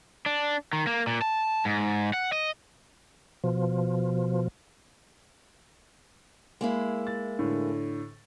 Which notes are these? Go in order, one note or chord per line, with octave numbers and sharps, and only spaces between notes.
D4
D#3
A#3
A#2
A5
G#2
F#5
D#5
B2 F3
G#3 A#3 E4
A6
A2 D3